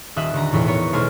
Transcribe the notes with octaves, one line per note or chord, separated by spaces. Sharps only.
D#1 D#5 E5 F#6
D#1 D3 A#5
B1 E2 A2
B3 A#4 C#5
B1 G#3 C5 G#5 F6